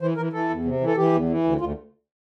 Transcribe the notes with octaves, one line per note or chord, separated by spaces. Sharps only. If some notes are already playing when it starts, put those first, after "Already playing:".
E3 C5
E3 A#4
E3 A4
E2
C3
E3
A4
E3 G4
E2
E3
D2
D2 F4